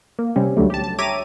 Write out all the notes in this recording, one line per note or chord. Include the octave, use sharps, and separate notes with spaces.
A#3
C3 G3 C4 C#4
C#2 G2 D3 F#3 G3 A3
G4 A5
A5
G4 C#5 E5 A#5 D6 D#7